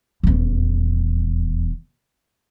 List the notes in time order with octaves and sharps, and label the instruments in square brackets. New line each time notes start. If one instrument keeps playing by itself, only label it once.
[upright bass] D#1 E2